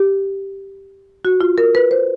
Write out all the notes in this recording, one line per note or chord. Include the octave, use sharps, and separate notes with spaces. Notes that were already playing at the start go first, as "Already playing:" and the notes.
Already playing: G4
F#4
F4
A#4
B4
C5